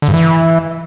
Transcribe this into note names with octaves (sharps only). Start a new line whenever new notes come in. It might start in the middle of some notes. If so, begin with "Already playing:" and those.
D3
G2
E3